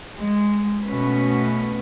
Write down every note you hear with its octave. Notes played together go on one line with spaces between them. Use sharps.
G#3
B2 A3 C#4 B4